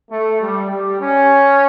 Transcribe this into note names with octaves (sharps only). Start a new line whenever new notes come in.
A3
G3
G3
C#4